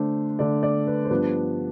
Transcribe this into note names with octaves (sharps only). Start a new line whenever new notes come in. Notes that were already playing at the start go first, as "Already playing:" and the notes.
Already playing: D3 A3 D4 C5
D3 A3 D4 D5
D5
B4
C5
G2 F3 B3 D4 B4